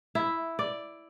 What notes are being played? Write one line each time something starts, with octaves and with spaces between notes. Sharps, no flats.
E4
D5